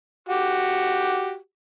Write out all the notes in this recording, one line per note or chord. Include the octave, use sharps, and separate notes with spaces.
F#4 G4